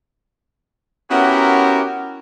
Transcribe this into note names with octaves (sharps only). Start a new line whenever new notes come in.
B3 C#4 E4 F#4 G4 A#4